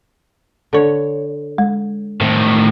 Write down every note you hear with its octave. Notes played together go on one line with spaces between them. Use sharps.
D3 C#5
G#3
A2 D#3 C4